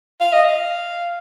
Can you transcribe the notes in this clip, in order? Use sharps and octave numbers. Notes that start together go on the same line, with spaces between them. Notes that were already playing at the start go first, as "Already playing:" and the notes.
F5
D#5
F5